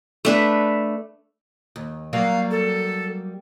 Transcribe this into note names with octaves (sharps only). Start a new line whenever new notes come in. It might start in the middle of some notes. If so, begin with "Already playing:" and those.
A3 D4 B4
D#2
F#3 G3 A#3 F5
A4